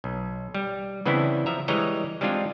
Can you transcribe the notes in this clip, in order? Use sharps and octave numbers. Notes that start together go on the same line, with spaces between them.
B1
G3
C#3 E3 B3 C4 D4 E4
F3 E5 A#5
E3 G3 G#3 C#5 D#5 A#5
G3 G#3 C4 D4 F4